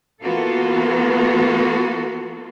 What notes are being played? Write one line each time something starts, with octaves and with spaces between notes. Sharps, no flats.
E3 A#3 B3 F4 F#4 A4